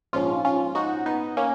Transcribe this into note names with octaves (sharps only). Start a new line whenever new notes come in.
A#1 G#2 F3 C#4 F4
C#4 F4
D#4 F#4
B3 D#4
A#3 C#4